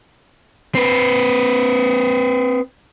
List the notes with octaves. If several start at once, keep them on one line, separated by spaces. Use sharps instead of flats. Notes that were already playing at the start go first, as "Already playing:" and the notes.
C4 B4